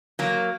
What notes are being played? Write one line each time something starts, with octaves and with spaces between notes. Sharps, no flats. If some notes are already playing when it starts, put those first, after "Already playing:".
F#3 A#3